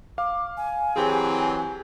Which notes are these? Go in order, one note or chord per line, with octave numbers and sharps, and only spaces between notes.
F5 D6
G#5
E3 F#3 C4 G4 G#4